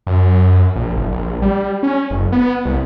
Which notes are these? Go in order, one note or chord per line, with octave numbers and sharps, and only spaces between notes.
F#2
A#1
F#1
A#1
G3
C#4
F#1
B3
C2